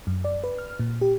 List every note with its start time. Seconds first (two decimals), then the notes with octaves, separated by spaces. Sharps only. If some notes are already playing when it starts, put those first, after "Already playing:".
0.07 F#2
0.24 D5
0.44 B4
0.58 F6
0.79 A#2
1.01 G4